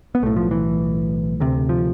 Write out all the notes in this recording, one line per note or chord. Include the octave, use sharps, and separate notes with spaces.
B3
B1 A2 A3
F3
E3
D2 C3
F3